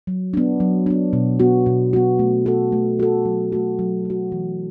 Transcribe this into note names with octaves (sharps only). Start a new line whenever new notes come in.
F#3
B3 D4
F#3
B3 D4
B2
B3 F#4
B2
B3 F#4
A3
F#4 A4
A3
F#4 A4
F#3
A3 F#4
F#3
A3 F#4
E3